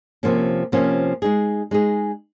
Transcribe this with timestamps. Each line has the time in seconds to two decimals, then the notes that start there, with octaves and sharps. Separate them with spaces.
0.23 C3 F3 A#3 C#4
0.72 C3 F3 A#3 C#4
1.22 G#3 D#4 G#4
1.71 G#3 D#4 G#4